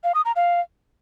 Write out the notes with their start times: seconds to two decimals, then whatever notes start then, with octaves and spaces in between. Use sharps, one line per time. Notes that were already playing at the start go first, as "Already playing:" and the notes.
0.04 F5
0.15 D#6
0.25 A#5
0.36 F5